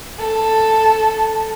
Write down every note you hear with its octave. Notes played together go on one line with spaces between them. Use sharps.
A4